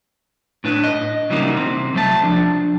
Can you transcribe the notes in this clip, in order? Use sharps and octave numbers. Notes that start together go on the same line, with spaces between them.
A2 D4 B4
D#5
C#3 E3 F#3 G3 A#3 D#4
C3 C4
C2 F#3 A3 A5
F3 D4